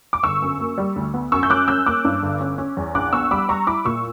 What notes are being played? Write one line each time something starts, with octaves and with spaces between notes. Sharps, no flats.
D6
G1 C#6 E6
F#2
A#3
G3
D2
B3
F#2 C#6 E6
G6
C#4 D6 F#6
C#4 E6 G6
A#3 D6 F#6
G2
G1
C#4
C#4
E2
A#1 D6 F#6
B3 C#6 E6
G3 B5 D6
G3 A#5 C#6
E4 B5 D6
A#2 C#6 E6